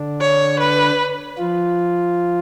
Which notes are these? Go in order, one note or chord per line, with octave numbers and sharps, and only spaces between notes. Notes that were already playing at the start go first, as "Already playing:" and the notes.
Already playing: D3 D4
C#5
B4
F3 F4